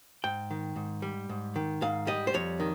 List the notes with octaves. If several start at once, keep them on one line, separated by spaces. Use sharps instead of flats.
G#2 G5
D#3
G#2
G3
G#2
D#3
G#2 F5
G3 D#5
C5
F2 C#5
D#3